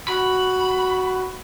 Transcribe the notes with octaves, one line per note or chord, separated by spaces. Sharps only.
F#4 B5